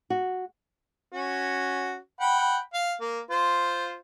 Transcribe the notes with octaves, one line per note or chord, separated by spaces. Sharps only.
F#4
C#4 F#4
F#5 G5 B5
F5
A#3
F4 C5